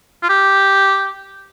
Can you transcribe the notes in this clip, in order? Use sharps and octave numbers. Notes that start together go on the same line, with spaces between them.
F4
G4